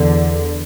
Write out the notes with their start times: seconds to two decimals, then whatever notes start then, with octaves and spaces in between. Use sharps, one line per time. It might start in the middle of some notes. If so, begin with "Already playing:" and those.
Already playing: E2 D3